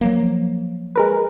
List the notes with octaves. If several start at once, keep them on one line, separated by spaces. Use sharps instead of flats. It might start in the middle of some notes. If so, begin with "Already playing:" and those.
F3 F#3 A#3
G#3 A#4 B4